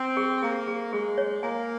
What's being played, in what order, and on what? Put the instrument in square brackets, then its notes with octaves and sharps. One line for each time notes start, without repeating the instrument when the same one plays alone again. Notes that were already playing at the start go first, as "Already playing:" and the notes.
Already playing: [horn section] C4
[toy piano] G#4
[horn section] A#3 [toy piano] G#4
[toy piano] G#4
[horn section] G#3 [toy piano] G#4
[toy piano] C#5
[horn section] A#3 [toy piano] G#5